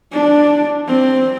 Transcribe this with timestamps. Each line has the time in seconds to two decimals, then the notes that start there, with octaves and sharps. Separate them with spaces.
0.13 D4
0.88 C4